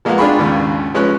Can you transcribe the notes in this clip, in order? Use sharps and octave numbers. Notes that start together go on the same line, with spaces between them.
F3 G#3 A#3 B3 F5 F#5
D4 F4 G#4 G5 B5 C#6
D#2 G#2 C#3
F3 G#3 C#4 B4 C#5 F#6